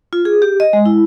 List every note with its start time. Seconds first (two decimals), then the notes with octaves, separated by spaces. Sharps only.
0.13 F4
0.25 G#4
0.42 G4
0.60 D#5
0.73 G#3
0.86 E4